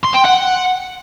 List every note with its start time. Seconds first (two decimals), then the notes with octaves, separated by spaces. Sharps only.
0.05 C6
0.15 G5
0.25 F#5